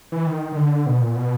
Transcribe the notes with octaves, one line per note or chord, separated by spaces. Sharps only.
E3
D#3
D#3
D3
B2
A#2
B2